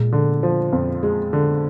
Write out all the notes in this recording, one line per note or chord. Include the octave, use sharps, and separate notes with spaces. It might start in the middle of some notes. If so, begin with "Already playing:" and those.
Already playing: A#2 G#3
D3
F3
F2
G#3
D3